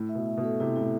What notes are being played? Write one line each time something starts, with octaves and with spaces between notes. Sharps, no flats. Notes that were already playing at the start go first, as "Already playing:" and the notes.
Already playing: A2 E4
E5
B2
E5
B2
A4
C3 E4
A2 E4